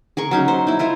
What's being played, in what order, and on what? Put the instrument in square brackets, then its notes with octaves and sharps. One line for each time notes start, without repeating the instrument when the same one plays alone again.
[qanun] G#4 A#4 C#6
F#3 C#4 D#4
C5
D#4 E4
E4 F4 A#4 C5